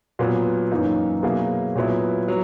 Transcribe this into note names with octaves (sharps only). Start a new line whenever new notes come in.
A#2 F#3 B3
F#2 E3 A#3 D#4
B2 F#3 A#3 E4 G#4
A#2 F#3 B3 E4
F#3